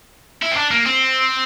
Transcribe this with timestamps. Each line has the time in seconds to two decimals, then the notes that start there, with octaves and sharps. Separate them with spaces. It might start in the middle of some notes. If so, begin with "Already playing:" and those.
0.43 E4
0.52 C4
0.57 D4
0.71 A#3
0.86 C4